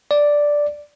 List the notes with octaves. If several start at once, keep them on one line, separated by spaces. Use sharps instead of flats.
D5